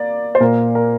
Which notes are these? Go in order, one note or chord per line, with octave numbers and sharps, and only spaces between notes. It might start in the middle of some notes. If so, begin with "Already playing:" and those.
Already playing: A#3 D5
C5
A#2 A#3 A#4
A#4